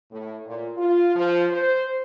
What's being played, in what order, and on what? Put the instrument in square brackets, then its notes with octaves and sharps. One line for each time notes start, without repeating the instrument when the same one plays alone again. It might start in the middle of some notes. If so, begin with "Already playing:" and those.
[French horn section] A2
A#2
F4
F3
C5